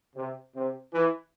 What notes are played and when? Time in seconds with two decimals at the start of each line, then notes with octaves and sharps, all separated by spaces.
0.15 C3
0.54 C3
0.92 E3